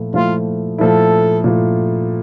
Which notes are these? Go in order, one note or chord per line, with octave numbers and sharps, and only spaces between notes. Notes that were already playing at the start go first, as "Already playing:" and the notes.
Already playing: A#2 F3 A3 E4
A#2 F3 A3 E4 F4
A#2 F3 A3 E4 A4
A#2 F3 A3 E4